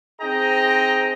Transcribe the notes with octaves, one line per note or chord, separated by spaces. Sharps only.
C4 D#4 G#4 D#5 G5 A#5